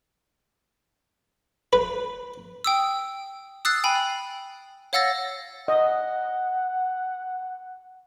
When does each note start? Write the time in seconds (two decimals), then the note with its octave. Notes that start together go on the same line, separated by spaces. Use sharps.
1.73 B4
2.64 G5 D#6 E6
3.65 D#6 E6 F#6 A6 C7
3.84 G5 G#5 B5
4.93 C#5 F5 F#5 E6 A6 A#6
5.68 D#5 F#5